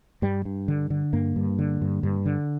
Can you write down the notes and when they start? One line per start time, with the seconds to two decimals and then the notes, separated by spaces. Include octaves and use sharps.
0.22 G2 G3
0.45 G2
0.68 D3
0.90 D3
1.13 G2 A#3
1.36 G2
1.59 D3
1.81 G2
2.03 G2
2.26 D3